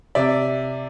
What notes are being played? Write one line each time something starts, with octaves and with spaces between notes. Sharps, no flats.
C3 D5 E5